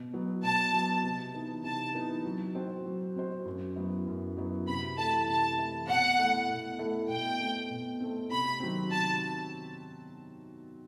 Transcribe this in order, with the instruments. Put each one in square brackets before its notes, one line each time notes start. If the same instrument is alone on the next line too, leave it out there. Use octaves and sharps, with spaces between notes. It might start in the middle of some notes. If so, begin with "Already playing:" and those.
Already playing: [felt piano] B2
F#3 B3
[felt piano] B2 [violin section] A5
[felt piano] F#3 B3
C3
E3 B3 D#4
[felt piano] C3 [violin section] A5
[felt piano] E3 B3 D#4
F#3
C4 F#4 C5
F#3
C4 F#4 C5
F#2
F#3 B3 E4
F#2
F#3 B3 E4
[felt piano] C3 [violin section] B5
[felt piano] E3 A3 E4 A4 [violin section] A5
[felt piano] C3 [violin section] A5
[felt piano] E3 A3 E4 A4
[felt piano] B2 [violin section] F#5
[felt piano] A3 E4 A4
B2
A3 E4 A4
[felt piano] B2 [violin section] G5
[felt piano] A3 C4
B2
A3 C4
[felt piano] C3 [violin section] B5
[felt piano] D#3 F#3 C4
[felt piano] C3 [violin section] A5